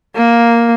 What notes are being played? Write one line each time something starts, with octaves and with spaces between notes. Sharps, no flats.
A#3